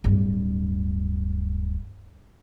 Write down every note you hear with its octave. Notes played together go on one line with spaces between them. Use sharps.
D1 G2